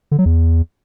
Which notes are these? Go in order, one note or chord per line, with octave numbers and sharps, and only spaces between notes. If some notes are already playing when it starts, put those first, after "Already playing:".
D3
F#3
E2